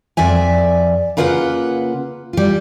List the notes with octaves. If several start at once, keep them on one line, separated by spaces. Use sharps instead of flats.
F2 D5 E5 G#5
C#3 A#3 F4 B4 D#5 F#5
G3 F4